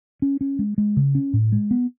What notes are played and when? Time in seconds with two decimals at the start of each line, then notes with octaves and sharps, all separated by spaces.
0.22 C#4
0.41 C#4
0.59 G#3
0.78 G#3
0.97 C#3
1.15 C#4
1.33 A2
1.52 G#3
1.71 B3